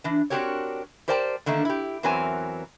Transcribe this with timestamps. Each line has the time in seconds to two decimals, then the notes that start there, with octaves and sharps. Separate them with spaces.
0.04 E3 D4
0.30 C4 D4 F#4 G4 A#4 C#5
1.08 G4 A#4 C5 D5 G5 A5
1.46 D3 D#3 A3 A#3 D4
1.65 E4 G4
2.03 E2 E3 F#3 C4 A#4 G#5